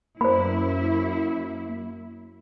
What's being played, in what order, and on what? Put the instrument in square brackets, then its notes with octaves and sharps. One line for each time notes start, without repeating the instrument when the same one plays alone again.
[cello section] F#2 E4 [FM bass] A#3 [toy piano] C5 B5